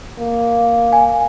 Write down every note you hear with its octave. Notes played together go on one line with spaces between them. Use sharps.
A#3
G#5